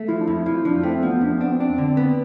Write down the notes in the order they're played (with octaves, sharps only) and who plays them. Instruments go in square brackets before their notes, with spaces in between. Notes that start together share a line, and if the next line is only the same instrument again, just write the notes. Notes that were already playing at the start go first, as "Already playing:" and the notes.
Already playing: [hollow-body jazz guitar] A3
[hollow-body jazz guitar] F3 [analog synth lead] E4
[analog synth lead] D4
[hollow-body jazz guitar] F2 [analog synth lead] E4
[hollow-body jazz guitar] F3 [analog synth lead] E4
[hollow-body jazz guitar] F3 [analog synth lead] D4
[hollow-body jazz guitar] A3 [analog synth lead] C4
[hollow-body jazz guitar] F3 [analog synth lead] B3
[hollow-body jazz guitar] F2 [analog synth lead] D4
[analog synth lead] C4
[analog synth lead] B3 [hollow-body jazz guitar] D4
[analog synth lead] C4
[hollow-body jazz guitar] D4
D3
B3